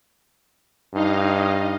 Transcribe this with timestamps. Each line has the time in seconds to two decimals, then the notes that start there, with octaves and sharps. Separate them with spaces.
0.94 G2 D#4 D#5 F5